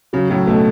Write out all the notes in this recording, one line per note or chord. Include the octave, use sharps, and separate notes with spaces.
C#3 F#3
A2 F#3
B2 A3